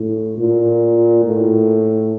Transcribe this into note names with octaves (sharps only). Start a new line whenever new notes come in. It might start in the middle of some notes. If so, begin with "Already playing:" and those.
Already playing: A2
A#2
A2